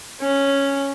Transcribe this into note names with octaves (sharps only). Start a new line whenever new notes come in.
C#4